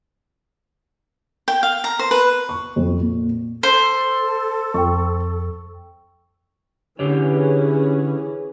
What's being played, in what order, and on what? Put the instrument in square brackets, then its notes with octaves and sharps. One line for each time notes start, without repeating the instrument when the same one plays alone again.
[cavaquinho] G5
F5
A#5
C5
B4
[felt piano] C#6
F2
A#2
[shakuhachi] A4 [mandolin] C5
[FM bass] F2 [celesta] G5 C#6
[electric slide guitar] D3 G4 C#5 [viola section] E3 C#4 G#4